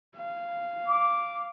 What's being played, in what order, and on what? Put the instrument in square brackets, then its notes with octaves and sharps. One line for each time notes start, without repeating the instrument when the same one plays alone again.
[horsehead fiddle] F5
[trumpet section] D6